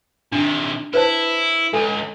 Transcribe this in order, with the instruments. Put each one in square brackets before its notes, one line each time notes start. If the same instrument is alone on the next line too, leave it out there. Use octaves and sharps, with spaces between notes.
[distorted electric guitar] C3 D#3 [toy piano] D4
[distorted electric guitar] E4 [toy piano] B4 C5 A5
[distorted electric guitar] C#2 [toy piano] A4 G#5